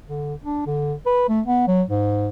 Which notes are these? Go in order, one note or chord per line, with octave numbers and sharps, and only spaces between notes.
D3
D4
D3
B4
A3
B3
F#3
G#2